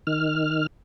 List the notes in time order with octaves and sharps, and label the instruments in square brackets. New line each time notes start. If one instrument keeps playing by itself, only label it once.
[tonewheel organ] D#3 F6